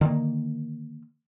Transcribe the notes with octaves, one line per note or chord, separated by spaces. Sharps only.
D3 D#3 A#3